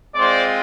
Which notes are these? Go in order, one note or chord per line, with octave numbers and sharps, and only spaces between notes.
G#3 C4 F4 C5 D5